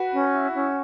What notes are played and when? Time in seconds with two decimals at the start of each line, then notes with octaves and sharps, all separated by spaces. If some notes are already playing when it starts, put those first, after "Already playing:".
Already playing: F#4 B4
0.12 C#4
0.33 E4
0.54 C#4